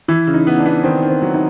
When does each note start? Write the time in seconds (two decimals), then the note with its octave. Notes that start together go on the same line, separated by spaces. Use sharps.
0.08 E3 E4
0.27 C#3
0.34 D#4
0.47 B3
0.59 D4
0.66 B3
0.83 D#3 C4
1.03 D#3
1.09 C4
1.22 F#3
1.34 D#4